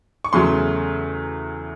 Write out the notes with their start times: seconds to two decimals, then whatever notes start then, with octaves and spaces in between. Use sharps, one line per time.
0.24 C#6
0.33 E2 C#3 F#3 A3 C6